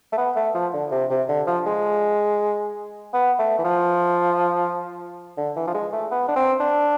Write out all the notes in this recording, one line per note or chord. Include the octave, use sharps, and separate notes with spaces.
A3
B3
A3
F3
D3
C3
C3
D3
F3
G#3
B3
A3
E3
F3
D3
E3
F3
G#3
A3
B3
D4
C4
D4